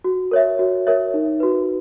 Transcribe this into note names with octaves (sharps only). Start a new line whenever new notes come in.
F#4
A#4 C#5 E5
F#4
A#4 C#5 E5
D#4
F#4 B4